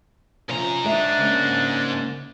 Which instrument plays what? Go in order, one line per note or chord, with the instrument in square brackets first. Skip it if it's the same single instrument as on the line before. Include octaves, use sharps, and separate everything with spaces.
[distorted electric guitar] G#2 A#5 [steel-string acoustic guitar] C3 F3 C#4
[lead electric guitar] G#3 [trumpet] D4 [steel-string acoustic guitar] E5
[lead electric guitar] C#3 A#3